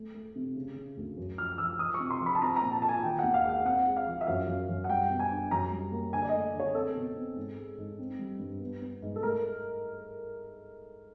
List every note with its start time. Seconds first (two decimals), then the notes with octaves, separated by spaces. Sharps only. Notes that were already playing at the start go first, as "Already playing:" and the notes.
Already playing: A3
0.15 A3
0.36 C3
0.56 C#3
0.76 C#3
0.97 D2
1.17 F#2
1.38 F3 F6
1.58 F3 E6
1.79 F3 D#6
1.94 C#6
2.00 C3
2.11 C6
2.20 F3
2.26 B5
2.35 A5
2.42 C4 A#5
2.56 A#5
2.62 A#2
2.72 A5
2.82 F4 A5
2.88 G#5
3.03 D#3 G5
3.19 D#2 F#5
3.34 F5
3.45 G#3 F#5
3.65 C4 F#5
3.86 G#3
3.96 F5
4.06 F3
4.21 E5
4.27 F#2 F5
4.47 F#2
4.69 F#2
4.84 F#5
4.89 G3 G5
5.10 B2
5.19 G#5
5.30 D4
5.51 F#2 A#5
5.71 G3
5.92 A#3
6.12 D3 G#5
6.22 D5
6.29 D#5
6.34 A3
6.54 D3
6.60 C#5
6.75 C4 A4
6.95 B2
7.16 C4
7.36 G#2
7.58 G#3
7.78 G#2
7.99 C4
8.19 G3
8.39 G2
8.61 B3
8.82 B3
9.02 G#2
9.16 A4
9.23 A3 A#4